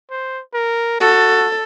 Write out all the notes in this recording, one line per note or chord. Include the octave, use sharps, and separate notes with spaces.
C5
A#4
F#4 A4